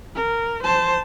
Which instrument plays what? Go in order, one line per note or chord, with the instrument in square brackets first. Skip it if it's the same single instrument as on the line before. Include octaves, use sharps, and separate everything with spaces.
[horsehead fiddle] A#4
C5 A5